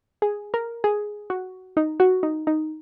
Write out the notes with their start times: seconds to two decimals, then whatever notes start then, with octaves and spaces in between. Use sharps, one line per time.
0.22 G#4
0.54 A#4
0.84 G#4
1.30 F#4
1.77 D#4
2.00 F#4
2.23 D#4
2.47 D#4